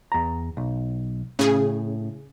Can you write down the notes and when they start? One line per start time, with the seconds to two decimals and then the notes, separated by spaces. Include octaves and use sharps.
0.12 E2 A#5
0.57 B1
1.39 A2 C#3 G#4